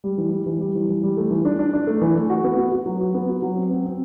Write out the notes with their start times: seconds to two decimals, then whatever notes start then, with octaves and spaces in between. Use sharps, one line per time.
0.04 G3
0.18 E3
0.32 G3
0.46 E3
0.60 G3
0.75 E3
0.89 E3
1.03 G3
1.17 A3
1.31 E3
1.45 D4
1.59 D4
1.73 D4
1.87 A3
2.02 E3
2.15 A3
2.30 F#4
2.44 B3
2.58 F#4
2.72 F#4
2.86 F#3
3.00 F#4
3.14 B3
3.29 F#4
3.42 F#3
3.57 C4
3.71 C4
3.85 C4